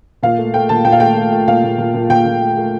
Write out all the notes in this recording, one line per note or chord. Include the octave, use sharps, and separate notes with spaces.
A#2 F5
A3
A3 G5
A#2 A5
A#2 G5
F5
A3 G5
A3
A3
A#2 F5
A#2
A#2
A#2
A#2 G5
A#2
A3
A3